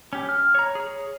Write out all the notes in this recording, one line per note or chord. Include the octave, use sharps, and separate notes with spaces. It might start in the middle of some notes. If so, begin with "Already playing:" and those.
C#4 G4
F6
C#5 A#5
G#4 C#5